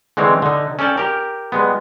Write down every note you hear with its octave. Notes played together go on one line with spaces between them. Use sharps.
D3 E3 G#3 C4 C#5
D3 D#4
C#4 A4 D5 G5 A5
G4 A#4
G3 G#3 B3